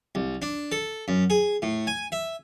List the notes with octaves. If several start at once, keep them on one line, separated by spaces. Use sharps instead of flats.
C2
D4
A4
F#2
G#4
A2
G#5
E5